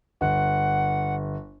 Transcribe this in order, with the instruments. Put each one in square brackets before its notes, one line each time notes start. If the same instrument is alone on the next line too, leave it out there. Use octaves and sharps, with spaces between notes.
[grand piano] G1 [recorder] F#5